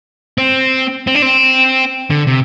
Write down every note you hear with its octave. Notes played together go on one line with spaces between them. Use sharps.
C4
C4
D4
C4
D3
C3